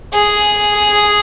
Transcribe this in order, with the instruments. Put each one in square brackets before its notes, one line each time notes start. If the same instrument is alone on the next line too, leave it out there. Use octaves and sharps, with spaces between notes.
[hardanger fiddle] G#4